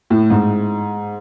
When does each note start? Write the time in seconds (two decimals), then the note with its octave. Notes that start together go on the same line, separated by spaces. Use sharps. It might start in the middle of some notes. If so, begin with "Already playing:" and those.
0.10 A2
0.30 G#2